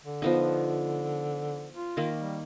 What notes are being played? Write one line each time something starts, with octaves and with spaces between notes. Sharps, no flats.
D3
F3 B3 D#4
F4
D#3 A#3
G3